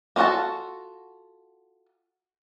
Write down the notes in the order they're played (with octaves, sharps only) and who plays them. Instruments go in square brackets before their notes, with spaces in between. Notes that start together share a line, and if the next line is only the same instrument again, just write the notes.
[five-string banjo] A#3 F4 F#4 A4 A5